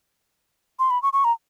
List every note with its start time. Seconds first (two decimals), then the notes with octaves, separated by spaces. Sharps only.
0.79 C6
0.90 B5
1.03 C#6
1.13 C#6
1.24 A#5